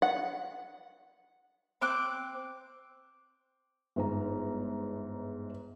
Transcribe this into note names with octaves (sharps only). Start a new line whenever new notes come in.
F#5
C4 D6 F#6
G1 G#2 A#5